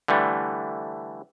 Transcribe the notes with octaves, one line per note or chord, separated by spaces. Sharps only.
D3 E3 G3 A3